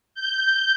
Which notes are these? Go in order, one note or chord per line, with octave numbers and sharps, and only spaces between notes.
G6